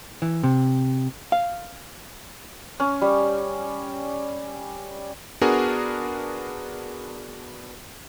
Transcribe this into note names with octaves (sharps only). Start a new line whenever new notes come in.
E3
C3
F5
C#4
G3
B3 D4 F#4 G#4 A#4